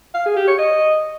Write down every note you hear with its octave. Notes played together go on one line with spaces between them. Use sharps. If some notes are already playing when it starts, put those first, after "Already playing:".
F5
G#4
G4
C#5
D#5